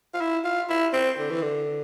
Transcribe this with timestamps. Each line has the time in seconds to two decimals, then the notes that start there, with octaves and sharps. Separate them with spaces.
0.14 F4
0.21 E4
0.44 F4
0.69 E4
0.93 C4
1.18 D3
1.30 E3
1.42 D3